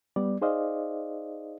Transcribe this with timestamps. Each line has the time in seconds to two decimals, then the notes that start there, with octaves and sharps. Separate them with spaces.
0.16 G3 B3 D5
0.41 D#4 G#4 C5 D5 D#5 F5